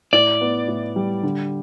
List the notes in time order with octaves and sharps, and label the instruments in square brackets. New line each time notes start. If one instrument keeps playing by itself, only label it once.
[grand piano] A2 [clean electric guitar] D5
[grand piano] B3
A2
G3
D3